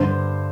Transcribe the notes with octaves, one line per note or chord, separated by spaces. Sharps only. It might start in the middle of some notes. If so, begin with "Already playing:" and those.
Already playing: G2 D3 C5